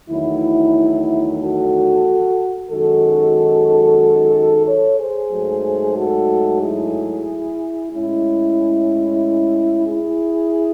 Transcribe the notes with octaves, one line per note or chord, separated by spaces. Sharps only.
E2 D#3 F#3 A3 E4
F#4 A4
F#2 D#3 G#3 D#4 F#4 A4
A4 C#5
G#4 C5
G#2 F#3 A3
F#4 A4
E4 G#4
A2 G#3 C#4 E4
E4 G#4